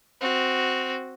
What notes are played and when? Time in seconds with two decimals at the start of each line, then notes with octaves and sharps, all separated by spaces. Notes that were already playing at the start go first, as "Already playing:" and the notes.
0.21 C4 F#4